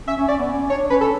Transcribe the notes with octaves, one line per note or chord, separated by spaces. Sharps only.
C#4 E5
C#4
C#4 D5
B3
C#4
D4 C#5
C#4 B4
A4